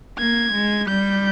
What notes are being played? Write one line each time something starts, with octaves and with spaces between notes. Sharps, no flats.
A#3 G#6
G#3
G3 G6